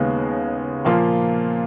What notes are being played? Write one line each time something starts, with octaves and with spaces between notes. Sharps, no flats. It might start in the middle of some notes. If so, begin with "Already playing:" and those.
Already playing: D#2 C#3 G#3 B3
A#2 F3 A#3 F4